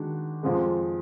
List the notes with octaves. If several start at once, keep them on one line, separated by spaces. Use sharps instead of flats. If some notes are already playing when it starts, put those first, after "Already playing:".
Already playing: D#3 G#3 D4 F#4
F2 F3 G#3